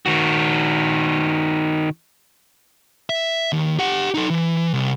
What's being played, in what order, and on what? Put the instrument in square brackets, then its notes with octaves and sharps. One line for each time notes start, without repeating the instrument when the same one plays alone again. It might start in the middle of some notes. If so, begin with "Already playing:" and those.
[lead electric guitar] D#3 F#4
E5
D#2
G4 F#5
D#4 A4
E3
C2